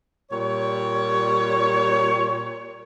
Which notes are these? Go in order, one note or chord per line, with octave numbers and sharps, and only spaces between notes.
A#2 G3 C#5